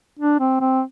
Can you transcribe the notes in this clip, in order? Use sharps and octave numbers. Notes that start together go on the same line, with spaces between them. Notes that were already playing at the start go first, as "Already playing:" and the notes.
D4
C4
C4